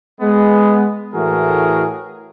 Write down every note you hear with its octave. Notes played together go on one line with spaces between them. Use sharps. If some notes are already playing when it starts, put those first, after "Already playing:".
G#3 B3
A2 E3 A3 F#4 G#4 A#4